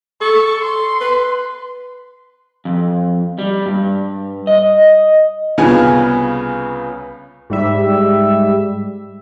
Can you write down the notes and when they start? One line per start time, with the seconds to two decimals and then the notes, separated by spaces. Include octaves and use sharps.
0.21 A4 C#6
0.61 C6
1.01 B4
2.65 F2
3.39 G3
3.66 G2
4.47 D#5
5.58 C2 C#3 B3 F4 G#5
7.50 G#2 G3 E5